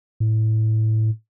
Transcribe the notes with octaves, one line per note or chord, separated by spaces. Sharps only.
A2